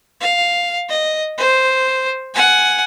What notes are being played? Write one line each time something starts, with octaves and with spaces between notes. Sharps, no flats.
F5
D#5
C5
F#5 G#5